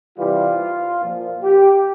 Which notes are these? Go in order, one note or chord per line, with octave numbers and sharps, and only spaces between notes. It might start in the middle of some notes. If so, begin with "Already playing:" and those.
C3 E3 G3 F4
A#2 F3
G4